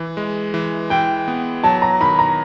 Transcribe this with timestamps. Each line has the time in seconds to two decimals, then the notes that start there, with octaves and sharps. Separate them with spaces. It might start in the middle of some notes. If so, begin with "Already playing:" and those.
Already playing: E3
0.17 G#3
0.54 E3
0.90 E3 G5
1.28 B3
1.64 F#3 A5
1.82 A#5
2.01 D#3 B5
2.19 A#5